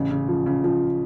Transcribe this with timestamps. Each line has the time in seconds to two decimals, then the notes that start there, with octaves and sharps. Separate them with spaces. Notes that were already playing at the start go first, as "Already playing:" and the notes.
Already playing: A1 C#3
0.11 C#3
0.28 F3
0.46 C#3
0.64 F3